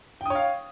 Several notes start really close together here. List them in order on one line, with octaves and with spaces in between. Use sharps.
G5 D#6 C#5 F5